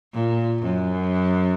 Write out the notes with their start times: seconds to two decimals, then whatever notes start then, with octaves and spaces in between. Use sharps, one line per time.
0.14 A#2
0.63 F#2